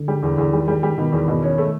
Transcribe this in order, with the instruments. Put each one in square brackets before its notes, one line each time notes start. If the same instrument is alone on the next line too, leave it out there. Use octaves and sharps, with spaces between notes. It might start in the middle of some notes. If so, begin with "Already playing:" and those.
Already playing: [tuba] D3
[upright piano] G3
E2
E2
[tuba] D#3 [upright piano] G3
[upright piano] G3
G3
[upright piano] B2 [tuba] D#3
[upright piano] E2
B2
C#4
A3